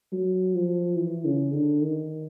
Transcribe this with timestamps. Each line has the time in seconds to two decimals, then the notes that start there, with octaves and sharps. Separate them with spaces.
0.12 F#3
0.54 F3
0.97 E3
1.25 C#3
1.52 D3
1.81 D#3